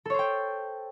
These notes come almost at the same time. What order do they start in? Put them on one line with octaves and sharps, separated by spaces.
A4 C#5 C5 G5